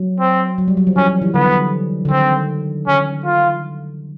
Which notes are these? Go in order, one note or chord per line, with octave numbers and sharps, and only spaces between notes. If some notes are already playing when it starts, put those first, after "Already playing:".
Already playing: F#3
C4
F#3
G3
F#3
F3
E3 C#4
F3
E3
D3 B3
D3
D#3 C4
D3 C#4
F4